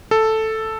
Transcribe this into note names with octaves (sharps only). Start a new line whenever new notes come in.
A4